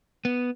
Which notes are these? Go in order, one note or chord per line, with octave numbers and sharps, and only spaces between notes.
B3